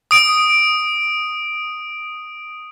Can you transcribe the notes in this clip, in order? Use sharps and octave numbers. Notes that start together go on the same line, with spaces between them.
D#6 D7